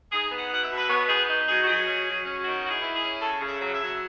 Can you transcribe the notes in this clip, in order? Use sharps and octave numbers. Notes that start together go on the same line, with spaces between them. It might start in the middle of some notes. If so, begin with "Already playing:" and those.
D#4 G#4
B3
F#5
B2 F#5
E5
B2
B4
B3 C#5
D#4 G#4
D#4
F#3 G#4
F#4
F#3 G#4
C#4
F#3
C#4
D#3 F#4
E4 F#4
G#4
E4
G#4
C#4
C#3 A4
C#3
E5
F#3
E5
F#3